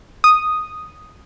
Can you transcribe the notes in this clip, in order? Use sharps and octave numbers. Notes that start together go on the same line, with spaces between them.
D#6